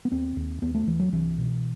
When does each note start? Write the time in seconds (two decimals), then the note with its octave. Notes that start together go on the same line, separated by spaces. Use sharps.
0.05 B3
0.12 D#2 C4
0.36 D#2
0.62 D#2 B3
0.75 A3
0.87 D#2 E3
1.00 F#3
1.12 C2 E3
1.38 B2